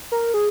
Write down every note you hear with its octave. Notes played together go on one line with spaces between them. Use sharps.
A#4
G#4